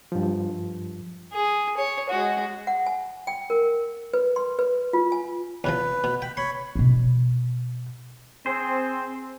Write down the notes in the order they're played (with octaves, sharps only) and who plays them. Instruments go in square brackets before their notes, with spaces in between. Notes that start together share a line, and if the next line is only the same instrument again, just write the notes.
[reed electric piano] G2 F3
[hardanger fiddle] G#4
C#5
G#3 F#4
[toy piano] F#5
G#5
G5
A#4
B4
C6
B4
F4
G#5
[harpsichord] E2 C3 F3 [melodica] B4
[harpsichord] B2
[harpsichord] G5 [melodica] B5
[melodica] C#5 B5 [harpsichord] C6
[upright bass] B2 D4
[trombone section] C4 [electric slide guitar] G#4 C5